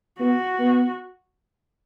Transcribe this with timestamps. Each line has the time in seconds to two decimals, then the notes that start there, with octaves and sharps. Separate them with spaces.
0.20 B3 F#4
0.59 B3